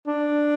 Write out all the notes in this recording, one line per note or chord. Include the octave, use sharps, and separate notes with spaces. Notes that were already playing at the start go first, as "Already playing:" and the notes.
D4